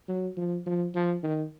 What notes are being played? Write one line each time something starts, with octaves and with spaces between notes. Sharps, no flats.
F#3
F3
F3
F3
D#3